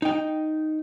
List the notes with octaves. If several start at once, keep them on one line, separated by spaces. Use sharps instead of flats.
D#4 G5